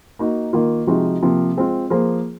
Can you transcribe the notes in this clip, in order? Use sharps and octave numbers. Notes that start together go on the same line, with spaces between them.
A#3 D#4 F#4
D#3 A#3 F4
C3 F3 G#3 D#4 F#4
C3 F3 A#3
G#3 C4 F4
F3 A#3 F4 G#4 C5